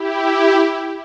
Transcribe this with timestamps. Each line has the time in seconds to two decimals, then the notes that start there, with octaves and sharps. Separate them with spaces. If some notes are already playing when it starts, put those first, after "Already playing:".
Already playing: E4 G4